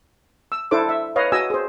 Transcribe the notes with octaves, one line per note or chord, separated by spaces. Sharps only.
E6
D4 E4 A4 C5 D6
E5
B4 C#5 D#5 F5
F#4 D#5 G#5 E6
G#4 C5